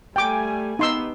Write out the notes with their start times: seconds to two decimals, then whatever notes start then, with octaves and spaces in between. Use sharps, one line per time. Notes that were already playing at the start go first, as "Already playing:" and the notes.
0.16 G3 A3 G5 G#5 D6
0.79 B3 D#4 G4 C6 E6